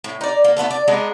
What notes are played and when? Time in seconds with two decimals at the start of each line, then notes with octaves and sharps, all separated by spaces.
0.04 A2
0.21 D#4 D5
0.44 A#3
0.57 A3 B3 F4 A4
0.70 D5
0.88 G#3 B3 D4 D#4